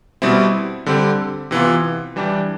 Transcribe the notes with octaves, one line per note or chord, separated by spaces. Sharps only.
B2 G3 C4 E4
D3 G3 C4 G4
C3 E3 B3 F4
E3 G3 D4 G4